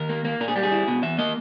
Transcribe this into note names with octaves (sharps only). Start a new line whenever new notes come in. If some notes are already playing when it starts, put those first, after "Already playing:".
Already playing: D#2 A#4
A#3
A#3
A#2 A#4
G#4
G3 G4
G#4
E4
B2
E2 E5
A#3 D#5